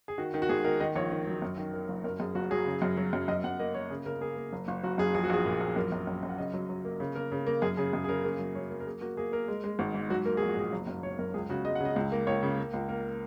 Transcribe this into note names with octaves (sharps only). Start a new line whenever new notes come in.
G#4
D#3 F#4
D#3
F#4
G#1 G#4
D#3 A#4
D#3 D#5
A#1 C#5
D#3
F#3
F#2
D#3
D#3 A#4
F#1
F#2 A#4
F#2 G#4
F#1 F#4
F#3 G#4
C#3
F#2
F#3
F#2
F#2 D#5
F#2 F#5
A#3 D#5
A#3 C#5
C#3 G#4
C#3 A#4
A#3 G#4
A#3
F#1
F#1
F#1 F#4
F#2 G#4
A#1 G#4
F#4
A#1 G#4
A#2
A#1
G#4
F#2 A#4
F#2
F#2
F#2
F#5
C#3 D#5
F#3
F#3
A#3
C#3
A#3 A#4
C#3
A#3
F#2 G#4
C#3 G#4
F#2 G#4
G#4
C#3 A#4
A#3 G#4
F#3
F#3 C#5
F#3 A#4
A#4
A#3 G#4
A#3 F#4
A#3 G#4
A#3 A#4
G#3
G#3
G#1
G#2
F#3 F#4
A#3 A#4
A#1 G#4
F#4
A#2 G#4
F#1
F#2
F#1 C#5
F#2 A#4
C#2 G#4
C#3 F#4
G#3 D#5
F#5
C#3 D#5
C#2
A#3
C#2 C#5
C#3
A#3
C#2
A#3 A#4